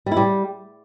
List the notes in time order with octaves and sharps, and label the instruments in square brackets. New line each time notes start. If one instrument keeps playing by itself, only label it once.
[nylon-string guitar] G3
E4
G3